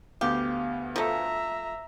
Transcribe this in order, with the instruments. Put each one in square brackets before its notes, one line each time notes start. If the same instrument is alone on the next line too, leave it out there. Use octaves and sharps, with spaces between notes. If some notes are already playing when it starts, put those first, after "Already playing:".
[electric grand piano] D2 B3 F5 [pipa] G4
[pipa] F3 A3 [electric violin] E5 A#5